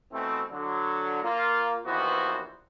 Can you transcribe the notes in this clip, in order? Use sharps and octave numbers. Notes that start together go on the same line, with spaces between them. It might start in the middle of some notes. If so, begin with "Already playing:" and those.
B2 E3 A3 C4
D3 F#3
A#3 F4
A#1 D#2 E3 B3 F#4 C5